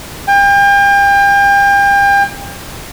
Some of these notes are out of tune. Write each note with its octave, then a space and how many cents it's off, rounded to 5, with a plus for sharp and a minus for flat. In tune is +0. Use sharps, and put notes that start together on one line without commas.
G5 +35